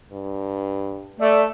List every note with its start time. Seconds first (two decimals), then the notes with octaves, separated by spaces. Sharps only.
0.13 G2
1.20 A3 D5